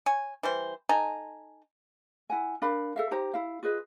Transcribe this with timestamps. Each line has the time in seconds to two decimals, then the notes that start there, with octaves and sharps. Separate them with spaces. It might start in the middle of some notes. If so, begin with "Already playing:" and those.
0.06 C#5 G#5
0.43 E3 G3 C5
0.89 D#4 A4 G#5 A#5
2.30 E4 F#5 G#5
2.62 D4 A#4 F5 B5
2.96 A4 E5 F5
3.11 D#4 G4 C5 A#5
3.34 E4 F5
3.63 F4 G#4 B4 D#5